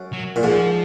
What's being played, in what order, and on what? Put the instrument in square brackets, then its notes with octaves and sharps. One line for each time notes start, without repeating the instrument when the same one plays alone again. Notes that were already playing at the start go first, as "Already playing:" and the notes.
Already playing: [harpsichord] F#2
[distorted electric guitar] F#3
[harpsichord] A#2
[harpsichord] G#2 [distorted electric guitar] F3